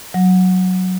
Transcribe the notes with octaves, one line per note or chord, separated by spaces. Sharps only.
F#3